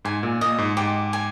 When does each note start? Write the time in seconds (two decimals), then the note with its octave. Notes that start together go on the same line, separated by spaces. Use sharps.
0.05 G#2 G#5
0.23 A#2
0.41 A#2 D#5
0.58 G#2
0.77 G#2 G4
1.13 G#5